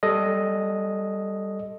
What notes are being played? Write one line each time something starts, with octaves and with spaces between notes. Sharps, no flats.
G3 A4 D#5